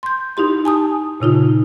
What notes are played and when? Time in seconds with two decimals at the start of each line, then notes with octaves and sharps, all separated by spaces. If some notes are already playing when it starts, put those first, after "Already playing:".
0.03 C6 G6
0.37 D#4 E4 G4 C6
0.65 G#5 A5 D#6
1.20 A#2 C#3 D#4 F4